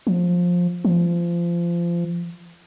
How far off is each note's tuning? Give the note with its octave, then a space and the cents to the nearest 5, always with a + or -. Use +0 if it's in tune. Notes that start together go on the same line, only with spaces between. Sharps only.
F3 +15
F3 -25